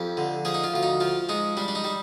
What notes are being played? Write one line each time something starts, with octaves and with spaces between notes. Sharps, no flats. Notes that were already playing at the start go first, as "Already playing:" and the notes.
Already playing: F2 G4
D3
F3 G#4
D#4
F4
D2 F4
D#4
F3 F4
G#3 D#4
G3 D4
D4
D#4
G3